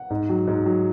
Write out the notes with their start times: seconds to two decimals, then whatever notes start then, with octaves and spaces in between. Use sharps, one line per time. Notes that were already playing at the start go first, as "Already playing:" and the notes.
Already playing: F#5
0.10 G#2
0.29 F#3
0.47 G#2
0.66 F#3